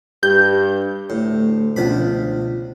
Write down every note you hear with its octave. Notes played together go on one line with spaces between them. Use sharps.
G2 G4 B4 G6
D2 A2
C#2 B2 F3 D4 B5